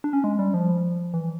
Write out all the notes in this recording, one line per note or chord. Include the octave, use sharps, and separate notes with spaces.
D4
C#4
G#3
G3
F3
E3